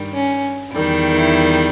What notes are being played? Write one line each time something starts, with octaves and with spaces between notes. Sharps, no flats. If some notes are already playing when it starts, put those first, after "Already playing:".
Already playing: G2 D#3 G3
C#4
E2 D#3 G3
E4